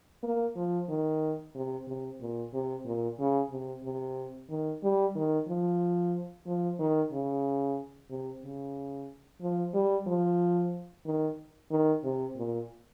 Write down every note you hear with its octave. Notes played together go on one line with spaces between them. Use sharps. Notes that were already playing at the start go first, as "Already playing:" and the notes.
A#3
F3
D#3
C3
C3
A#2
C3
A#2
C#3
C3
C3
D#3
G3
D#3
F3
F3
D#3
C#3
C3
C#3
F3
G3
F3
D#3
D#3
C3
A#2